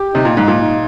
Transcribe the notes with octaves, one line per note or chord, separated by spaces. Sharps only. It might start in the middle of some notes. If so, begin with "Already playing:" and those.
Already playing: G4
C3 D#4
A#2
G#2 D#4
A#2
D#4